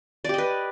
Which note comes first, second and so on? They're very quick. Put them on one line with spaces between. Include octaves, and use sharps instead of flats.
D5 G4 D#5 B4